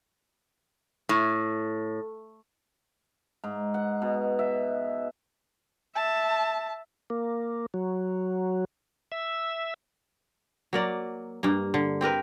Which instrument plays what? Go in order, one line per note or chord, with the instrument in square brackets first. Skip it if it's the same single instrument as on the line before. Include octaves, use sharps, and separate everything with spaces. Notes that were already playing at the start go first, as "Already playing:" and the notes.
[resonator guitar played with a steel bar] A2
[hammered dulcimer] G#2
F#5
B2
E5
[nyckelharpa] E5 [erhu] A5
[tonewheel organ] A#3
F#3
E5
[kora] F#3 A#3 D5
G2 A#3
D3
C4 G4 A#4 B4